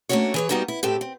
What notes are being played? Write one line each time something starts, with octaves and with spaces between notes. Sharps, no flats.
A3 A#3 C#4 D4 F#4 C#5
E3 G#4 C#5
G3 A#3 B3 D#4 F#4 A4
E4
A2 C4 G4 A4
C4